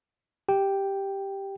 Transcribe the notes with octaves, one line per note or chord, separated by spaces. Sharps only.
G4 G5